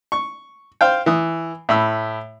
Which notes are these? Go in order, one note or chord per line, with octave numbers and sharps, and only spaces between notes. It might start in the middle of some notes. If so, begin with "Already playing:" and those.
C#6
C5 F5 G5
E3 D#6
A2 B5 E6